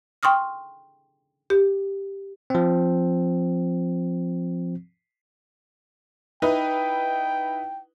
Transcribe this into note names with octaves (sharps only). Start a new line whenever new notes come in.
G5 C6 C#6 D#6 F6
G4
F3 C4
D#4 E4 B4 G5